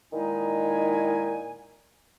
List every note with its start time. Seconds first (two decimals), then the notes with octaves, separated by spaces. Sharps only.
0.12 A#2 D#3 G#3 D#4 E4 G#5